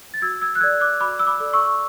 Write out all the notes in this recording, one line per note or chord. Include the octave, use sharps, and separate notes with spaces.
A6
F#4 E6 G#6
E6 G#6
F#6
A4 D5 E6 G#6
D6 F#6
F#4 B5 D6
E6
B5 D6
A4 D5
C#6 E6